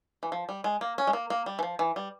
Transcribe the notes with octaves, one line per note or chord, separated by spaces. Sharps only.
E3
F3
G3
G#3
A#3
C#4
G#3
A#3
A#3
G3
E3
F3
E3
G3